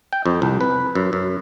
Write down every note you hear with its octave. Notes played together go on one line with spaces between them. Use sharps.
G5
F2
C2
B4
F#2
F#2